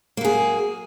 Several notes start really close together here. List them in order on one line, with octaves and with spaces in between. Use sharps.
A#3 F#3 G#4